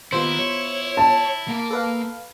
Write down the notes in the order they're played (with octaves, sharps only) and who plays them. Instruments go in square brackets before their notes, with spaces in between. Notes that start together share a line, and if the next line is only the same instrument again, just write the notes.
[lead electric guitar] D#3 G4 [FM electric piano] B3 F4 C5 [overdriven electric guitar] E4
[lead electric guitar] C#5
[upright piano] A5
[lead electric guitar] A#3 A#4
[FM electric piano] A4 B4 F5